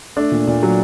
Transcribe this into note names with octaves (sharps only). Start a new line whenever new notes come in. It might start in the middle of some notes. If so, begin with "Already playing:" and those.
A3 D4
A#2
A#2
F#3